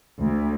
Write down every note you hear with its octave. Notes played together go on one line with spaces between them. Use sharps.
D2